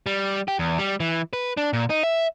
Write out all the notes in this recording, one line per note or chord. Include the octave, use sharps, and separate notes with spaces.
G3
G4
E2
G3
E3
B4
D4
A#2
D#4
E5